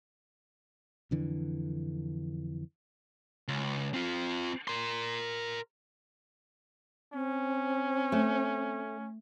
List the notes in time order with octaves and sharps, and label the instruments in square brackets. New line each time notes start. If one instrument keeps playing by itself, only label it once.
[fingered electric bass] F2 D3 E3
[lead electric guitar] C#2
C4 F4
A#4 C6
[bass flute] C4 [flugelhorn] C#4
[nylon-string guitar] A3